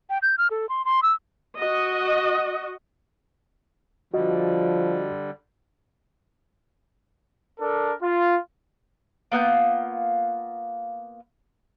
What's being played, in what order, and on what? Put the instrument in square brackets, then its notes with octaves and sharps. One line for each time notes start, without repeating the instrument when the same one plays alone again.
[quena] G5
G6
F6
A4
C6
C6
E6
[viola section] F#4 D#5
[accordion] D3 G3 [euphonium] F3 [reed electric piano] F#4 D#5
[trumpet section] D4 A4 A#4
F4
[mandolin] A#3 B3 F4 G6